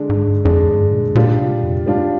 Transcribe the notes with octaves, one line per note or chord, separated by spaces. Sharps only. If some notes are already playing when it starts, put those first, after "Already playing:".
Already playing: D3 G#3 D4 G#4
G#2
G2
F2 D3 G#3 D4 G#4
G2
A#2
A#2 G3 D4 F4
C3
F2
G2 G3 D4 F4